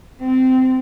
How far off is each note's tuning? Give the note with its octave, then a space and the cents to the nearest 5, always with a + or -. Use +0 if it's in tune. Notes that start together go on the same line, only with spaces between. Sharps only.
C4 -20